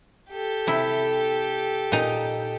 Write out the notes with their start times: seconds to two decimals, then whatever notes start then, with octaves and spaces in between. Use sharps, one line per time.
0.30 G4 A4
0.67 C3 E4
1.92 A#2 D#4